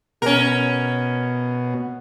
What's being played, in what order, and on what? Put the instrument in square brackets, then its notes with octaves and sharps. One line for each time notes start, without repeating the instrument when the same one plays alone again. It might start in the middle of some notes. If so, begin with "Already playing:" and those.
[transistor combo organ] B2 [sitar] C#4 A#4